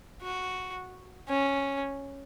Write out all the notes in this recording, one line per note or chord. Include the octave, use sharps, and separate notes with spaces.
F#4
C#4